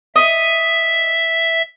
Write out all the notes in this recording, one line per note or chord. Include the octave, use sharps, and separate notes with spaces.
D#5 E5